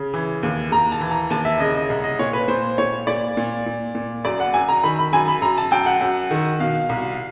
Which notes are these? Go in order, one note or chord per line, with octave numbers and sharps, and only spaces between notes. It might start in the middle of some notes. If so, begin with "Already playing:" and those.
Already playing: C#3
E3
D#2
D#2 A#5
A5
E3
A#5
D#2 A5
E5
C#3 D#5
D#5
C2
D#5
A#2 C#5
B4
A#2 C5
A#2 C#5
A#2 D5
A#2
A#2
A#2
F#2 D5
F#5
F#2 G#5
A#5
D#3 B5
B5
F#2 G#5
B5
F#2 A#5
A5
F#2 G5
F#5
F#2
D#3
B2 F5
C2